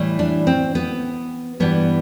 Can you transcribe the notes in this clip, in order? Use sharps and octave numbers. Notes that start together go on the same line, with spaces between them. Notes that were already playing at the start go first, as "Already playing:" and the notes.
Already playing: A2 E3 G3
D4
C4
B3
G2 E3 G3 B3